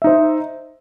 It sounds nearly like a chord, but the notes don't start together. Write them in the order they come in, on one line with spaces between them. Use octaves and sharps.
E5 D#4 C5